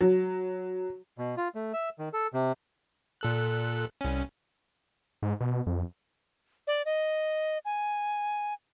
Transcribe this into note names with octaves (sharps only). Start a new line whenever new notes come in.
F#3
B2
F4
A3
E5
D#3
A4
C3
A#2 A4 F#6
C2 C#4
G#2
B2
F2
D5
D#5
G#5